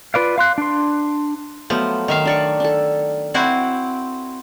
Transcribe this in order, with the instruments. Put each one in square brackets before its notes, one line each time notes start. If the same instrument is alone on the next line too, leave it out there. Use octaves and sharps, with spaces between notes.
[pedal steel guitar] F4 B4 D5 F5
F5 C6 F#6
D4 C6
[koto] F3 [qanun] F#3 A3 B3
[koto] D#3 E5 F5
[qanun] D4 D5 C#6
D4 A4
[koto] C4 E4 F#4